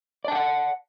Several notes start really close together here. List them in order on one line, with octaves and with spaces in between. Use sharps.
D5 A5 G5 F#5